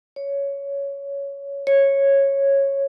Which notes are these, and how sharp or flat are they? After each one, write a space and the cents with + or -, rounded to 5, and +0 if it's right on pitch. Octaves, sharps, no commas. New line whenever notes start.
C#5 +10
C#5 -10